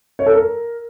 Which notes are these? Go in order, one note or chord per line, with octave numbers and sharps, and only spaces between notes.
C#5
A4
A#4